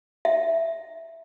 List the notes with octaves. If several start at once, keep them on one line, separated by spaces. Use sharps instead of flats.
E5